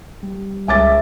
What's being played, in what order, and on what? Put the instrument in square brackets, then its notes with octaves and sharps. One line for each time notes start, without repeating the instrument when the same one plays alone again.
[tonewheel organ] G3
[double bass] C#2 [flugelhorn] E5 [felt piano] G#5 D6 A6